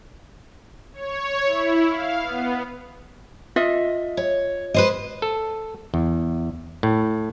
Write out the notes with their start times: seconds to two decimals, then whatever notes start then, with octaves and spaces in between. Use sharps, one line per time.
0.94 C#5
1.46 E4
1.88 F5
2.22 B3
3.56 F4 D#5 E5
4.17 C#5
4.74 B4 C5 D#5
5.22 A4
5.94 E2
6.83 A2